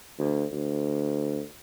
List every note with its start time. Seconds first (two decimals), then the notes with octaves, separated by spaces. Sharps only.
0.18 D2
0.52 D2